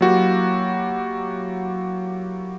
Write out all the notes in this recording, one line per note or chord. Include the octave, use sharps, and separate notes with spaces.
F#3 A#3 E4 F#4 G4